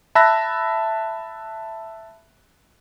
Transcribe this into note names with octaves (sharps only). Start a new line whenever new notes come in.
E5 A5 B5 E6 F#6 A#6